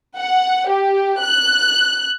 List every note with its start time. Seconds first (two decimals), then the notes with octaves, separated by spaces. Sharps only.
0.18 F#5
0.69 G4
1.23 F#6